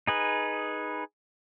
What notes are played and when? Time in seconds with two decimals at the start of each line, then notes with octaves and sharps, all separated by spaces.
0.07 D#4 G#4 B4